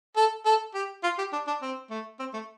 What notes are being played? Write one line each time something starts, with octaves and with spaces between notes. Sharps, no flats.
A4
A4
G4
F4
G4
D4
D4
C4
A3
C4
A3